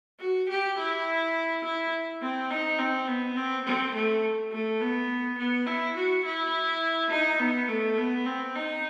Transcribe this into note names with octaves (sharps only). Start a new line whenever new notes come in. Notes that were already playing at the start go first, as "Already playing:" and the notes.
F#4
G4
E4
E4
C4
D#4
C4
B3
C4
C4
A3
A3
B3
B3
E4
F#4
E4
D#4
B3
A3
B3
C4
D#4